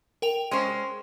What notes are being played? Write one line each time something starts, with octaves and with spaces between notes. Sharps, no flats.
A#4 G5 F7
G#3 C#4 C5